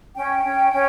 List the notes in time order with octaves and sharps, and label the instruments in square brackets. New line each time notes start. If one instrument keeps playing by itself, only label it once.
[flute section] C#4 G5
C#4
C#4